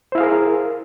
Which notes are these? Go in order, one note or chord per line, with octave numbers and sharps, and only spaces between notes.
E4 G#4 A#4 C5 F5